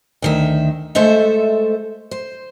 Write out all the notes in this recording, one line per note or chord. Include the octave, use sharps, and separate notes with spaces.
D2 D#3 E5
G#3 A3 A4 C5 E5
C5